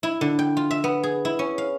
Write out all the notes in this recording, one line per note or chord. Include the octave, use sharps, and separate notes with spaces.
E4
D3
G5
F4
E5
B3
G#4
E4
C#4
F5